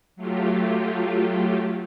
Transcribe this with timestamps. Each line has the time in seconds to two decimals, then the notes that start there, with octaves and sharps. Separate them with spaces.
0.16 F#3 A3 F4 G4